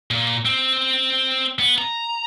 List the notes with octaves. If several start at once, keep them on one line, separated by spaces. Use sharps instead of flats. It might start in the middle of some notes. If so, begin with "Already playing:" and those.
A#2
C4
B3
A#5